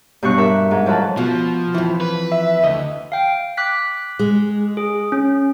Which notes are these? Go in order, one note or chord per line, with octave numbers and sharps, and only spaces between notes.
G2 B2 G3 C#6 F#6
A#4 E5
G#2
F3 F#3 A4 B4 A5
B2 F3
F2 E3
B4
E5
D2 D#5
F5 G5
D6 F#6 B6
G#3
G#4
C#4